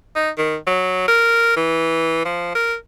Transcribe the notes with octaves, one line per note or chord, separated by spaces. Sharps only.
D#4
D#3
F#3
A#4
E3
F3
A#4